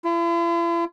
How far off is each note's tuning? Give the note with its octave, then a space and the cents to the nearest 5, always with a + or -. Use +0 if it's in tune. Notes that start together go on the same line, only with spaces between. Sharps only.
E4 +45